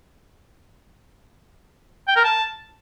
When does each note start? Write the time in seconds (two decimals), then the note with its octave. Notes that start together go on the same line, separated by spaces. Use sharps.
2.08 G5
2.16 A#4
2.24 A5